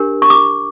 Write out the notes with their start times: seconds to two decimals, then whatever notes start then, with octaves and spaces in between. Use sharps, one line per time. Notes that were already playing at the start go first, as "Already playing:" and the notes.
Already playing: D4 G4 A#4
0.22 C#6
0.30 D6